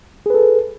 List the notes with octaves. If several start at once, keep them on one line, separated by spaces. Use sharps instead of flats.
G#4 A4 B4